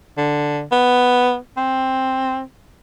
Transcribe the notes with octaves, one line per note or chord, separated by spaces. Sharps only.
D3
B3
C4